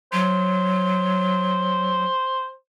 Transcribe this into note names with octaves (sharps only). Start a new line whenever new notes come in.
F#3 C5